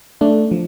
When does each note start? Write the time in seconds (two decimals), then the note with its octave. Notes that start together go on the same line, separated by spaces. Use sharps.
0.21 A3 D4
0.51 F3